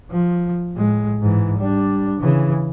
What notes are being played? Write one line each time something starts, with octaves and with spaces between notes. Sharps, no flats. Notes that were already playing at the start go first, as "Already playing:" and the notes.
F3
A2 G#3
G#2 E3
G3 D4
C#3 E3